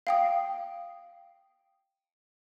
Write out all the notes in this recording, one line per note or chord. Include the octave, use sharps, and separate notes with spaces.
F5 G5 D#6